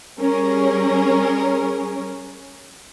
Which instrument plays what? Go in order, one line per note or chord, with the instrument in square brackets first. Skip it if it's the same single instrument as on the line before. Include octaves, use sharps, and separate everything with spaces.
[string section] G3 C#4 G#4 A#4